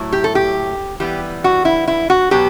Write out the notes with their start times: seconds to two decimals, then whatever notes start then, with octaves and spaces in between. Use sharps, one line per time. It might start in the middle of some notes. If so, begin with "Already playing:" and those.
Already playing: A2 F#3 E4
0.12 G4
0.24 A4
0.35 G4
1.00 E3 G3 B3 G4
1.44 F#4
1.65 E4
1.88 E4
2.10 F#4
2.31 B2 F#3 B3 G4